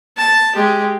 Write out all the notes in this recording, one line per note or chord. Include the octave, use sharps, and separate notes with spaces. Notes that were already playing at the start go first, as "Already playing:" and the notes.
A5
G#3 G4